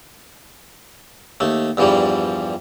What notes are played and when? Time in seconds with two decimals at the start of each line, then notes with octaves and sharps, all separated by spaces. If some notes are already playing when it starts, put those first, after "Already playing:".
1.40 D#2 A3
1.77 E2 G2 E3 F3 G3